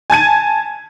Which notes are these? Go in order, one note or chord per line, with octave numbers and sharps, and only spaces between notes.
G#5 A5 G#6 D#7